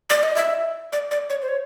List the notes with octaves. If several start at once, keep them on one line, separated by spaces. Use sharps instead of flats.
D5
D#5
E5
D5
D5
C#5
C5
C#5